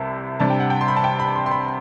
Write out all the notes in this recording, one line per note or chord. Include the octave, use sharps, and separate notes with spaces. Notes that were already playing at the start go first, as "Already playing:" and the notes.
Already playing: C2 C3 E5 A5
C3 G3 D4 A5
G5
F#5
G5
C6
B5
A5
G5
B5
C6
C6
B5